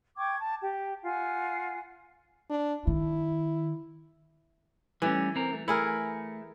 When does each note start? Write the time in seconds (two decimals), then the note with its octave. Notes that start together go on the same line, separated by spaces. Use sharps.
0.17 G5 C#6 D6 G#6
0.39 A5
0.61 G4
1.03 F4 F#5 G#5
2.50 D4
2.87 D#3 E4
5.02 E3 G3 A3 C#4
5.36 C4 A#4
5.53 A3
5.68 A3 E4 G#4 A#4